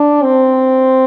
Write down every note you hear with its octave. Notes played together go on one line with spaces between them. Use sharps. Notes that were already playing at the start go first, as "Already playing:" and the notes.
Already playing: D4
C4